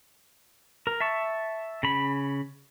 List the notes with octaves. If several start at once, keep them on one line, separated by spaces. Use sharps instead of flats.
A#4
E5 A5 C#6
C#3 B5